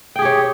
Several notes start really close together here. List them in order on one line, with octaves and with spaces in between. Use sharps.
G5 G#4 G4 C#5